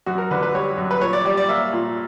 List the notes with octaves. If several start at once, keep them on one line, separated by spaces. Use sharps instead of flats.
F#2 F#4
A#4
D3 B4
B4
G3 C#5
F#2
B4
A#2 C#5
D5
G3 D5
D5
A#3 E5
A#2